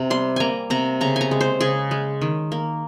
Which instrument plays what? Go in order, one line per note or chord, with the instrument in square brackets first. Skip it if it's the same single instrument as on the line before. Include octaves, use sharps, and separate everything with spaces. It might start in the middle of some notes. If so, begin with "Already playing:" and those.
Already playing: [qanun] C3 A#5
G3 C6
A#3 G#5 A#5
C3 A#5
C#3 A#5
G#5 A#5
G#3
C5
C#3 G#4
G#3
D#3
A#3